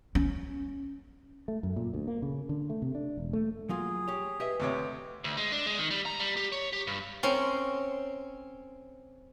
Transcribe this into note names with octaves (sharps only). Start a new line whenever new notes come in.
C#4
A3
F#2
A#2
D2
A#3
C#3
D3
A3
C3
D4
E1
A3
F#3 A#3 F4 G#4
G4 C#5
G4 B4 D#5 E5
D2 C3 C#5
D2
G#3
D4
G#3
D#3
G3
A#5
G3
G4
C#5
G4
G2
C4 C#4 A#4 C6